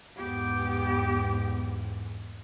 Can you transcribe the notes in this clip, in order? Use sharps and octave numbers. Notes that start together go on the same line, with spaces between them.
E2 G#2 B3 G4